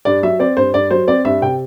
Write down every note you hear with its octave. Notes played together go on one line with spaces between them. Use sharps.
G2 D5
F#3 E5
C4 D5
G2 C5
G2 D5
F#3 C5
C4 D5
G2 E5
C3 G5